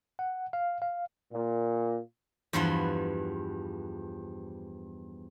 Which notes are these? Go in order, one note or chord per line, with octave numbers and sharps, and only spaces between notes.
F#5
F5
F5
A#2
E2 G2 F3 B4 F#5 C6